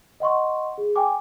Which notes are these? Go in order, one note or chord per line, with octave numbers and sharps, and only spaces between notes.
D#5 F#5 C6 C#6
G#4
G5 G#5 D6